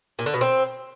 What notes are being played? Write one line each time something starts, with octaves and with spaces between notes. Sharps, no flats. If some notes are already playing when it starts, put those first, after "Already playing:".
A#2
D3
B2
C4